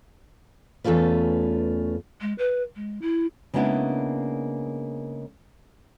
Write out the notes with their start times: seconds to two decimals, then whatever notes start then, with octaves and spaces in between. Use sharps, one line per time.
0.84 E2 A3 C#4 F4 B4
2.21 G#3
2.38 B4
2.75 G#3
3.01 E4
3.54 C#3 G#3 A#3 B3 D4 E4